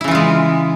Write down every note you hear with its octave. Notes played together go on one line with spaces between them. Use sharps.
C#3 E3 G#3 E4 F4